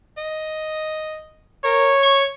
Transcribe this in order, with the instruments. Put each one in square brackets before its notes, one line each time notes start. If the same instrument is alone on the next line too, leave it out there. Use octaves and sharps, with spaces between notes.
[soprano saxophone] D#5
[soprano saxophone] A#4 [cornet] C#5
[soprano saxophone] C#6